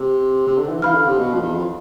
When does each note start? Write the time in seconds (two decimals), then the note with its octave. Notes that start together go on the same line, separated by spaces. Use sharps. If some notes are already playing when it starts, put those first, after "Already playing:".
Already playing: C3
0.47 C3
0.58 D3
0.70 E3
0.82 E3 F5 B5 F6
0.95 D3
1.06 C3
1.18 B2
1.34 F2
1.42 E2
1.54 F2